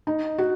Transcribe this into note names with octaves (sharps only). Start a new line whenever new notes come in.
D#4
F#4